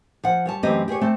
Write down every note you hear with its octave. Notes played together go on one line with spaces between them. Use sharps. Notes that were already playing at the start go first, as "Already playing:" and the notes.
F3 F#5
G3 C#5 A5
F#2 E3 A3 C4 G4 D#5
G4 G#4 C5 C#5
A3 C4 A5